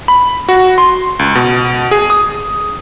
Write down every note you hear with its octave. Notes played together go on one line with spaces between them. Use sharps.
B5
F#4
C6
C#2
B2
G#4
D#6